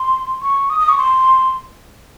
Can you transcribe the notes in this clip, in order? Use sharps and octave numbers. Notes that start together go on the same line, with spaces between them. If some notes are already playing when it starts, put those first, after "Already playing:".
Already playing: C6
C#6
D#6
D#6
C#6
C6